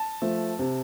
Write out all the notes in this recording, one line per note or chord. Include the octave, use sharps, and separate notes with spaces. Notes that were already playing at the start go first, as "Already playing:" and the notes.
Already playing: A5
F3 A3
C3